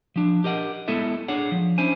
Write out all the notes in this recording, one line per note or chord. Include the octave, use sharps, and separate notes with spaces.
F3 D4
G4 A#4 D#5 F#5
G#3 B3 E4 A4 E5
D4 G#4 C#5 F#5
F3
C#4 D4 E4 C5 G#5